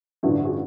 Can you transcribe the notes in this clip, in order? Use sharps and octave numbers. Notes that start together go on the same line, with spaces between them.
A1 G2 D3 F3 E4 F#4
D4
F#4 G#4